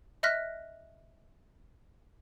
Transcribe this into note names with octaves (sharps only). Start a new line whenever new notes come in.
D#5 E5 F6 F#6 A#6 B6